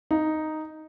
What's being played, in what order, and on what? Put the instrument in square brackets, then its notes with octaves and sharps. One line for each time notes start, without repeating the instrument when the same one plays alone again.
[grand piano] D#4